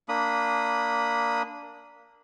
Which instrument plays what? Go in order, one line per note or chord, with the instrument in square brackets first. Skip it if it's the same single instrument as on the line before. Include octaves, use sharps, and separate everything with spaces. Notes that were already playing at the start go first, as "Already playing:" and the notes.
[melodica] A#3 D4 B5 D#6